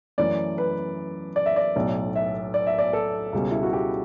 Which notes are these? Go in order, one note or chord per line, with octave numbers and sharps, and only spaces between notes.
F#2 E3 A3 D5
B4
D5
E5
D5
B1 A2 F#3
E5
D5
E5
D5
A4
C#2 B2 G3 C#4
E4
F#4
G4